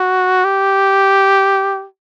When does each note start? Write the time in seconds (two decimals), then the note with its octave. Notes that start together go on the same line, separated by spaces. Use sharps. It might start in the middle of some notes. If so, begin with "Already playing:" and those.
Already playing: F#4
0.44 G4